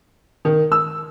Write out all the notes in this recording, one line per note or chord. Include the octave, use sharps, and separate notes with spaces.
D#3
E6